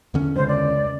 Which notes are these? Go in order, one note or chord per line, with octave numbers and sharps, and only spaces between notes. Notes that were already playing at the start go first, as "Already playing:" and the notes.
E2 D3 C#4
C#2 G2 C5
D5